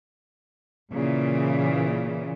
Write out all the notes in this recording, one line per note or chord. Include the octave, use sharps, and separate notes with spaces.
A#2 C#3 E3